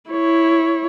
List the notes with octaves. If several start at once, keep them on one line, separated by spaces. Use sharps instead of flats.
E4 C#5